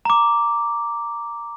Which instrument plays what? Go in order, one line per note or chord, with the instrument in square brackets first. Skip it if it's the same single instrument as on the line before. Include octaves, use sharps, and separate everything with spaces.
[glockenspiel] A#5 D6